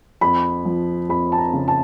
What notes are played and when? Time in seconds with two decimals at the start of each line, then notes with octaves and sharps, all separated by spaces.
0.21 F2 B5
0.65 F3
1.09 F2 B5
1.32 A5
1.38 A#5
1.53 C#3
1.68 A5